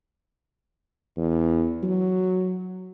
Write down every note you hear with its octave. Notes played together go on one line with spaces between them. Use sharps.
E2
F#3